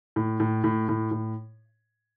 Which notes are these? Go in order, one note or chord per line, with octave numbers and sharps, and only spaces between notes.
A2
A2
A2
A2
A2